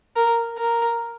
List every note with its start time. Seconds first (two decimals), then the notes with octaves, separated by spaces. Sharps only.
0.16 A#4
0.58 A#4